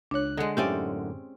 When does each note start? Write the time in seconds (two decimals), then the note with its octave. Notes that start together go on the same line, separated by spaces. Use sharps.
0.11 C#2 D4 C#5 F#6
0.37 D3 G#3 D#5 F#5 G#6
0.57 F#2 A2 D3 C4 C#4 G4 D5 E5